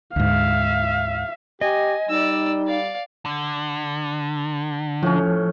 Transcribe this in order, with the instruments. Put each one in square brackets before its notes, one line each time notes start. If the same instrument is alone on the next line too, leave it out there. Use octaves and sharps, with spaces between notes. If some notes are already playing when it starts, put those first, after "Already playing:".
[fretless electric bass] D2 G#2 [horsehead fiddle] E5 F5
[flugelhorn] G4 [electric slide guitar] D#5 [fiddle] G#5
[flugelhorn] G3 [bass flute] D#4 [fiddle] D5 E6
[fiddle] D5 F5
[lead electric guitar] D3
[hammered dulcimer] A2 C#4 [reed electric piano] F3